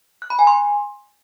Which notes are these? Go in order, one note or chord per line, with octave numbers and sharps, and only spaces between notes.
F#6
B5
G#5
C6